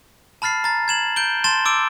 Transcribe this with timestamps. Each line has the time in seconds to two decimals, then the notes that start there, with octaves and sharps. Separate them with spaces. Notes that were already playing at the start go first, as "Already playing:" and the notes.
0.42 A5 B5 F6 A6 C7
0.64 A#5 A6
0.88 G#6 E7 F#7
1.16 G6 D7 G7
1.44 A5 C6 A6 E7 G7
1.65 D6 E6 D7